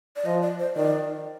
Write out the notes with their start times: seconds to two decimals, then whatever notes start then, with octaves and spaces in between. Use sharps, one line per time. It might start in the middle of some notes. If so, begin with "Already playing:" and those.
0.16 D5
0.25 F3 D#5
0.42 D5
0.59 C5
0.76 D#3 D5